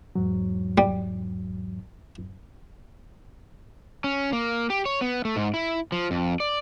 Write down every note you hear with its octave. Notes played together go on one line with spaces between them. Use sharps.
E2 G#2 F#3
G3
C#4
A#3
G4
C#5
B3
A3
G#2
E4
F3
F2
D5